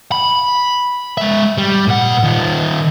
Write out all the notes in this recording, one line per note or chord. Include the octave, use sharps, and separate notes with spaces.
B5
G#3 E5
G3
A#2 F#5
D#3 F4